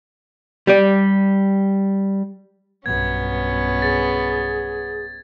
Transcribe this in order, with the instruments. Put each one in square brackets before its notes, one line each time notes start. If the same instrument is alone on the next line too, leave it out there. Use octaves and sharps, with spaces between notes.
[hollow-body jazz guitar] G3 G4 D5
[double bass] B1 G2 [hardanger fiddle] B3 C#4 [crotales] G#6
[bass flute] G#4 [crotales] A6